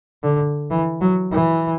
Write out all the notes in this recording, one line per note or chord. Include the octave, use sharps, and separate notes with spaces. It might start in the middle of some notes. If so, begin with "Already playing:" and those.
D3
E3
F#3
E3